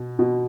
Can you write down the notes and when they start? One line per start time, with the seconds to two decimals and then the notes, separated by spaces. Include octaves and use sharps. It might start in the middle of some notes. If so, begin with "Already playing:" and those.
Already playing: B2
0.19 B2